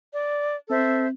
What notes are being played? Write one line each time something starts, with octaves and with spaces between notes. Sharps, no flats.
D5
C4 A4 C5 E5